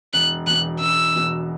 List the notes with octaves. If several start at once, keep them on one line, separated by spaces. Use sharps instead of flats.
E1 F#6
E2 B2 F#6
E1 E6
E2 B2